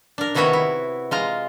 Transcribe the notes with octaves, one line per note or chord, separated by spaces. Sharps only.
D4 A#4
C3 D#3 B3 E4 F#4 C#5
E4
G#3 F4 A#5